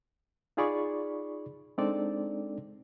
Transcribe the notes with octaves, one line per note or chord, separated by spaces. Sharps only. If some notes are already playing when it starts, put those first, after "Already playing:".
D#4 F4 G#4 D5 B5 C#6
G#3 C4 D4 D#4 A4 D5